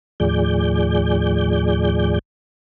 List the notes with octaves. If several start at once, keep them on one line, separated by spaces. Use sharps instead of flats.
D#2 A2 F3 G#4 D5 G6